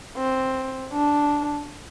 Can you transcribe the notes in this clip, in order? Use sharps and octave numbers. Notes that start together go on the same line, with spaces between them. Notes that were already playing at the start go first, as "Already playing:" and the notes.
C4
D4